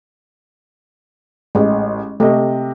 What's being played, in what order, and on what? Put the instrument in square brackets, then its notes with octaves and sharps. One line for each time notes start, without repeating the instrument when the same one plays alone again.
[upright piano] A1 [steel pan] G#3
[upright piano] C3 D#5 [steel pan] A3